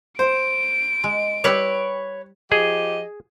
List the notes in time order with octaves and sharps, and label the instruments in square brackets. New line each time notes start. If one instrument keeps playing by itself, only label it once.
[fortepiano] C5 [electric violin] D7
[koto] G#3
[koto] G3 E4 G4 [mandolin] B4 C#5
[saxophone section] F3 G4 D#5 [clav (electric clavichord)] G#4